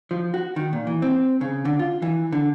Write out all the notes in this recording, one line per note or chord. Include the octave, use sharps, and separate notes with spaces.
F3
F#4
D#3
A#2
E3
C4
C#3
D3
F4
E3
D3